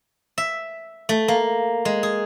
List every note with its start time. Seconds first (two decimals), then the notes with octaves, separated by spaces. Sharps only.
0.38 E5
1.09 A3
1.28 A#3
1.85 G#3
2.03 G#4